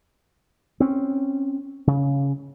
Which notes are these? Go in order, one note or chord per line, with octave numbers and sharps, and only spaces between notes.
C4 C#4
C#3